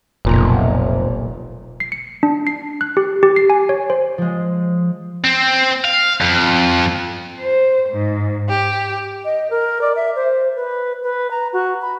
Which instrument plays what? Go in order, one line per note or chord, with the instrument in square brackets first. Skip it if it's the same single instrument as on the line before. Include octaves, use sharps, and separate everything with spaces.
[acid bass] F1 [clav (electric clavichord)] B1 A#2 A#5
[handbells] C7
C#7
D4
C7
F#6
G4
G4
C7
G#5
C#5
C5
[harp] F3 G#3
[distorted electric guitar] C4
F5
F2
[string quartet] C5
G#2
G4
[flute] D#5
A#4
D5
E5
C5
B4
B4
A#5
F#4
B5